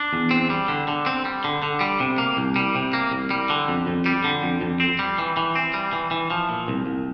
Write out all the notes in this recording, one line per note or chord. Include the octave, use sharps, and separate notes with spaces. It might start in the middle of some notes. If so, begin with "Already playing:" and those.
Already playing: D4
E2
C4
G3
D3
D3
C4
G3
D3
D3
G3
C3
A#3
C2
G3
C3
A#3
C2
G3
D3
F2
F2
G3
D3
F2
F2
C4
G3
E3
E3
C4
G3
E3
E3
F3
A#2
C2
C2